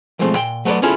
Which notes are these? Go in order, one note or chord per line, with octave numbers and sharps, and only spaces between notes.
B1 F3 G#3 A3 C4
A#2 G5 C6
F#3 A3 B3 B4 D5
B3 C#4 E4 F4 G#4 A4